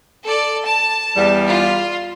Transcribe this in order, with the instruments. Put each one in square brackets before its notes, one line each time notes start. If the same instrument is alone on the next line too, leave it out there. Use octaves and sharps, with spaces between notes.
[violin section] A4 D5
A5
[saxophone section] E2 G3
[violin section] F4